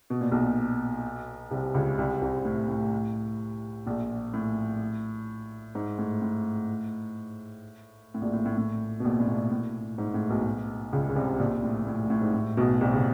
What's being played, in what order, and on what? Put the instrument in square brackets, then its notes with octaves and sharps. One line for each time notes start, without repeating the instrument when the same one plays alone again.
[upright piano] B2
A#2
B1 B2
C2 C3
C#2 C#3
C2 C3
C2 C3
A2
A2
A#1 A#2
A2
G#2
A2
A2
A2
A#1 A#2
A2
A2
A2
B2
A#1 A#2
A2
A#1 A#2
A2
G#2
A2
B1 B2
C#2 C#3
C#3
C2 C3
A#1 A#2
A2
A2
A2
G#2
A2
B1 B2
C2 C3
C#3